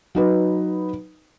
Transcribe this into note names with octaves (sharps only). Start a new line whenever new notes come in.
F#3 D#4 B4